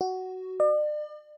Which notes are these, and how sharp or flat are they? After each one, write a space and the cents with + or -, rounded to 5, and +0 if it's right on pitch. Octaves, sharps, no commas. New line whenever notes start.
F#4 +10
D5 +40